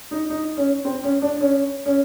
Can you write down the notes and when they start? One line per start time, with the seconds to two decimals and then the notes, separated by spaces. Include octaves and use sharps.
0.11 D#4
0.30 D#4
0.57 C#4
0.85 C4
1.04 C#4
1.22 D4
1.41 C#4
1.86 C#4